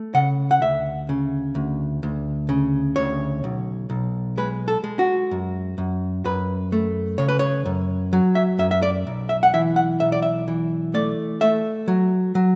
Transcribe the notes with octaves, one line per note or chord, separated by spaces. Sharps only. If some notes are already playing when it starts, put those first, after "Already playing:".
Already playing: A3
C#3 F#5
F#5
D2 E5
C#3
D2
D2
C#3
D2 C#5
B1
B1
G#3 B4
A4
G#3
F#4
F#2
F#2
F#2 B4
A3
C#3 C#5
B4
C#5
F#2
F#3
E5
F#2 E5
E5
D5
B1
E5
F#5
E3 E5
F#5
B1 E5
D5
E5
E3
A3 D5
A3 E5
F#3
F#3